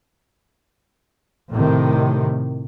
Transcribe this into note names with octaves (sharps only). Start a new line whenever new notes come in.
A2 C3 D#3